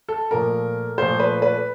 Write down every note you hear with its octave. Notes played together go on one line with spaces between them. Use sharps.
A4
A#2 F3 A3 A#4
A#2 F3 A3 C5
B4
B4